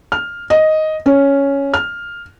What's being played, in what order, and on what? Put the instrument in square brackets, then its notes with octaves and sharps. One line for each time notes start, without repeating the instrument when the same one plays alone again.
[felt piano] F6
D#5
C#4
F6